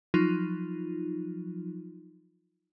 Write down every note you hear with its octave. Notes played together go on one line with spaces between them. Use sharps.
F3 F#3 D#4 F4